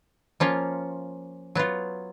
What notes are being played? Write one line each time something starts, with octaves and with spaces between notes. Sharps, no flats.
F3 A#3 C#4 F4
F#3 B3 F4